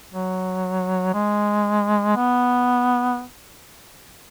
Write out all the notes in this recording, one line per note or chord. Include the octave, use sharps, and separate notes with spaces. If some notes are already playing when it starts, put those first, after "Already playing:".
F#3
G#3
B3